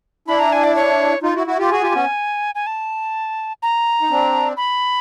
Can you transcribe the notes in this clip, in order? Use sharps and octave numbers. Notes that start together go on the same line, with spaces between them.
D4 E4 B5
A#5
G#5
D5
C#5
D#4 F4
E4 F#4
E4 F#4
F4 G4
F#4 G#4 G#5
F4 G4
B3 C#4
G#5
A5
A#5
D#4
C4 D4
B5